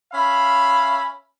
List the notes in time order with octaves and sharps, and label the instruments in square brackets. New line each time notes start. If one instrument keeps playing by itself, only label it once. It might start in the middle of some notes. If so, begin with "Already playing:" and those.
[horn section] C#4 E5 F5 B5